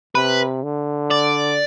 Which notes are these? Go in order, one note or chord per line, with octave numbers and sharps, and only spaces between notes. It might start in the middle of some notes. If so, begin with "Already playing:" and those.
C3 B4
D3
D5